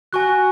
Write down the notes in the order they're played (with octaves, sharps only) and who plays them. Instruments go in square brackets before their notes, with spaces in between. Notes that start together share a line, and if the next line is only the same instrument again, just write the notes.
[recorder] F#4 [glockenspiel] G#5 C#6 F#6